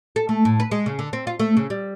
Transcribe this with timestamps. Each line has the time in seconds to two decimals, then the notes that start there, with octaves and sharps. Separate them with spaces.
0.16 A4
0.29 A3
0.45 A2
0.60 B4
0.71 G#3
0.86 C#3
0.99 D3
1.13 C4
1.27 F4
1.39 A3
1.57 C#3
1.70 G3